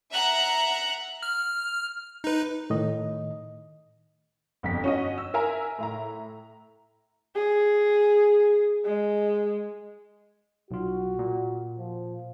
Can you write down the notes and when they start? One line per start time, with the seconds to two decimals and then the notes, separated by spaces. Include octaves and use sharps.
0.12 E5 F#5 A#5 F#6
1.23 F6
2.24 D#4 B4
2.70 A2 D#3 D#5
4.63 G1 F2 B2 B6
4.84 C#4 F#4 D#5
5.18 E6
5.34 A#4 E5 G#5 A#5
5.78 A2 E5 A#5
7.35 G#4
8.85 G#3
10.71 B1 F4 F#4
11.19 A#2
11.78 F3